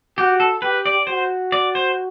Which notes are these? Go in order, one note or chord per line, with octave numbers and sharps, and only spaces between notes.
F#4 G4
A4
G4 B4
D5
F#4 C5
D5
C5